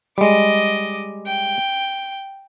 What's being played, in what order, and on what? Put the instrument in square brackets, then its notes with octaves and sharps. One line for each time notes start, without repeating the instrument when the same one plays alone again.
[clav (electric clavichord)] G3 G#3 [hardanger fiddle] D#5 D6
[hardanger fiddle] G5